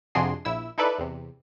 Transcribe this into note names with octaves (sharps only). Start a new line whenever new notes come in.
F2 C3 D4 F#4 G#4 C6
A#1 E4 E6
D#4 E4 A4 B4 D5
E2 C3